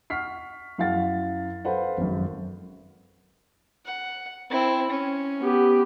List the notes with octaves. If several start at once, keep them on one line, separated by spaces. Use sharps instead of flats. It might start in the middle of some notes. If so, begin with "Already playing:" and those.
F#5 C#6 F6 B6 C7
F#2 E4 F5 F#5 F6 A6
A4 B4 C5 F5 F#5
G#1 F#2
F#5
C4 E4
C#4
B3 G4